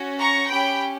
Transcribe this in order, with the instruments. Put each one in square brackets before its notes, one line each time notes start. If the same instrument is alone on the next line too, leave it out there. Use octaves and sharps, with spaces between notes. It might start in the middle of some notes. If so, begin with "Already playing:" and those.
Already playing: [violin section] C#4 F#4
A#5 C#6
C#4 G4 G5 B5